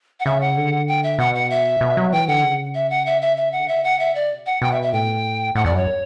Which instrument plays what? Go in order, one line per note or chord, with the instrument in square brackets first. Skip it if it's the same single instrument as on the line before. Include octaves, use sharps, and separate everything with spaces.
[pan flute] F#5
[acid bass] C#3 [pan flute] E5
[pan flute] F#5
[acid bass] D3
[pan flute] G5
E5
[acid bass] B2 [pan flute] F#5
[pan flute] F#5
E5
[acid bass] B2
F#3
[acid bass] E3 [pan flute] G5
[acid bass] D3 [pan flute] F#5
[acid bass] C#3
[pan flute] E5
F#5
E5
E5
E5
F#5
[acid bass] D3
[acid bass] C#3 [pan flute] E5
[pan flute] F#5
E5
D5
[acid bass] B2
[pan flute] F#5
[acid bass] B2 [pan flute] G5
[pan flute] E5
E5
[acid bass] A2 [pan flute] G5
[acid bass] A2 [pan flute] F#5
[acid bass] E2 [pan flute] D5
[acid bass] F#2
[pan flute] C#5